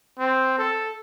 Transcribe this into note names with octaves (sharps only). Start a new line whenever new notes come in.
C4
A4